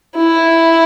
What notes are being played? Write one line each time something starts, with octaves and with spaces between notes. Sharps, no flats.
E4